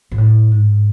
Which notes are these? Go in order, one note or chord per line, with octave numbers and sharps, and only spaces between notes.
G#2
A2
G#2